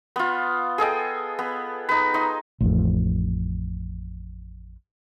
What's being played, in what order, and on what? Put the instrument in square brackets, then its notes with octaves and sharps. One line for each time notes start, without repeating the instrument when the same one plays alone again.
[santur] B3 F4
G#4 A4 D#5 G5
B3
D#4 B4
D#4 C6
[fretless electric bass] A1 F2